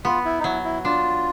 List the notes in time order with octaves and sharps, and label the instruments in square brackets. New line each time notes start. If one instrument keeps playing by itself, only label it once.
[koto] B3 [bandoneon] F4
[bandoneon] E4
D#4
[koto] F#3 [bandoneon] E4
[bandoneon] E4
[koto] D4 [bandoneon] F4